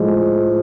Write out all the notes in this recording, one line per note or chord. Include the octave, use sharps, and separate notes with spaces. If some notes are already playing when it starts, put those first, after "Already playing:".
Already playing: A2 F3 G#3